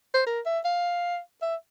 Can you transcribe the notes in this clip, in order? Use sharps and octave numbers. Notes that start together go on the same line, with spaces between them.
C5
A#4
E5
F5
E5